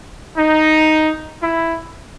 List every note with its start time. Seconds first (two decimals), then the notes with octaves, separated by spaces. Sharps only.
0.38 D#4
1.42 E4